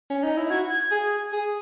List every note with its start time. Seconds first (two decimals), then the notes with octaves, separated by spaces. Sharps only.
0.10 C#4
0.24 D#4
0.37 E4
0.50 F#4 G#6
0.70 G#6
0.92 G#4
1.33 G#4